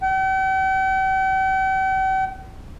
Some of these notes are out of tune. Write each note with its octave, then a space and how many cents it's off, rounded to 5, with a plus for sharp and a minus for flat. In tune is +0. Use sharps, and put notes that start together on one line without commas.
G5 -45